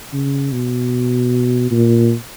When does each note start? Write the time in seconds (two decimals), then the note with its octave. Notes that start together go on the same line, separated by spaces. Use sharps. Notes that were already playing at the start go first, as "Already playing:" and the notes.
0.13 C#3
0.52 B2
1.71 A#2